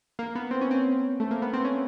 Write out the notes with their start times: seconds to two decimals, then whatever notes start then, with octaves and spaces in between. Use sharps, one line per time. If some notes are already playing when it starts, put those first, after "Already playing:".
0.19 A#3
0.35 B3
0.51 C4
0.61 C#4
0.71 C4
1.20 A3
1.31 A#3
1.42 B3
1.53 C4
1.65 C#4